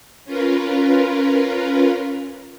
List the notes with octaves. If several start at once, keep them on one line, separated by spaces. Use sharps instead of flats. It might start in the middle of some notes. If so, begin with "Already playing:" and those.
C#4 F4 A#4 B4